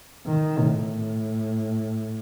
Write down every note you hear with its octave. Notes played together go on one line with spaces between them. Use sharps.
D#3
A2